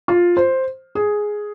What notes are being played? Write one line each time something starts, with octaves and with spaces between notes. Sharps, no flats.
F4
C5
G#4